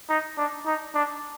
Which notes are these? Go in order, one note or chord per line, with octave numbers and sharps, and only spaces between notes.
D#4
D4
D#4
D4